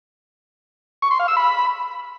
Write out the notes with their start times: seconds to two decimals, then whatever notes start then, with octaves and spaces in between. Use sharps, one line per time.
1.02 C#6
1.11 C6
1.19 F5
1.28 E6
1.37 B5